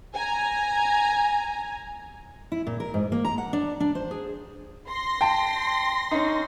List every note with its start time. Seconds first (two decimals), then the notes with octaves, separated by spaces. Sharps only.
0.15 G#5 A#5
2.52 E4
2.67 A#2
2.80 A#4
2.94 G#2
3.12 A#3
3.25 A#5
3.38 F#5
3.53 D4
3.80 D4
3.95 C5
4.11 G#4
4.89 C6 A#6
5.21 G5 A5
6.11 C#4 D#4